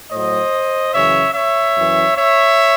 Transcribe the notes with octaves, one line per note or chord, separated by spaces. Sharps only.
A2 F#3 C5 D#5
F#2 C#3 E3 C#5 E5
C#5 E5
F#2 E3
C#5 E5